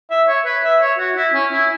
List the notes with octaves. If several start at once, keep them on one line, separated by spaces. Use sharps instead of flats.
E5
C#5
B4
E5
C#5
F#4
E4
C#4
E4